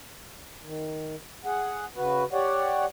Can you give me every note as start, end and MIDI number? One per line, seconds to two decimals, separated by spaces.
0.62 1.15 51
1.45 1.85 68
1.45 1.85 78
1.96 2.24 49
1.96 2.24 66
1.96 2.24 71
2.33 2.85 67
2.33 2.85 73
2.33 2.85 74
2.33 2.85 78